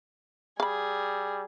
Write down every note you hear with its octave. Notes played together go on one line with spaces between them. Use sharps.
G3 G#4 F5 B5